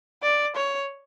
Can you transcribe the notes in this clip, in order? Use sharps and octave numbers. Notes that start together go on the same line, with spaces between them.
D5
C#5